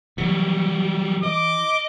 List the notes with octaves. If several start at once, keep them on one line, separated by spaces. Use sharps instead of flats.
E3 F#3 G3
D#5 D6